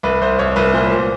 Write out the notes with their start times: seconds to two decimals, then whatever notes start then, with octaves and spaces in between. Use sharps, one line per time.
0.03 C2 B4
0.21 C2 C5
0.39 C2 C#5
0.56 C2 B4
0.73 A#2 C5
0.92 A#2